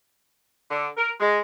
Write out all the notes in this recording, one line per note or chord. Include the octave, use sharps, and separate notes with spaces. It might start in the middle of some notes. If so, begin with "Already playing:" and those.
D3
A#4
G#3